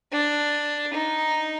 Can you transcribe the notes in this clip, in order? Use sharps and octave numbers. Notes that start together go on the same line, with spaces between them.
D4
D#4